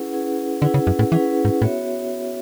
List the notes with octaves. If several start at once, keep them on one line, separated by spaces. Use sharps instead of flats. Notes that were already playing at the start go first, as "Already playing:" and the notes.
Already playing: C#4 E4 G#4 B4 F#5
C#4 E4 G#4 B4 F#5
D3 C#4 E4 G#4 B4 F#5
C#3
F#2
A2
E3 C#4 E4 G#4 B4 F#5
G#2
A2 B3 F#4 C#5 E5